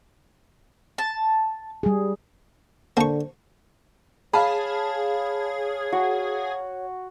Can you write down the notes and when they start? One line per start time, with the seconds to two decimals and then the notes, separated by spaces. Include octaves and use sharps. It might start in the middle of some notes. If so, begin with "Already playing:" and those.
0.98 A5
1.83 G3 G#4
2.97 D3 A#3 C5 A5 C#6
4.33 G#4 C#5 F5 A5 B5
5.92 F#4